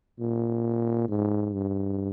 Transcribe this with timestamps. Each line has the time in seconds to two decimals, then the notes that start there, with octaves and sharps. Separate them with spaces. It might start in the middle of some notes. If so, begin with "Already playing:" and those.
0.19 A#2
1.08 G#2
1.54 G2